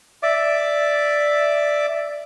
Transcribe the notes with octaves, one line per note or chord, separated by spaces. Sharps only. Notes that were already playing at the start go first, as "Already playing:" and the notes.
D5 E5 D6